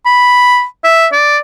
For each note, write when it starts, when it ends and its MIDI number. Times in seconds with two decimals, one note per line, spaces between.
0.06 0.64 83
0.84 1.07 76
1.13 1.38 74